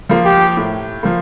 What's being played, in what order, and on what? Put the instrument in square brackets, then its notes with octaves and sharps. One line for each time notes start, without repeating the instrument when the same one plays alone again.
[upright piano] F3 A#3
[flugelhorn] G4
[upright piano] A2
F3 A#3